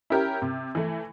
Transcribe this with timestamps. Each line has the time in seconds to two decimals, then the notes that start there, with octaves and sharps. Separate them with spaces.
0.10 C#4 E4 G4 A#4
0.42 C3
0.75 E3 A3